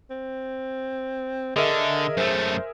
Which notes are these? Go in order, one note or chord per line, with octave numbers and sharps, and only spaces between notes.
C4
D3 G#4 A#4 D#5 E5
F#2 A3 C5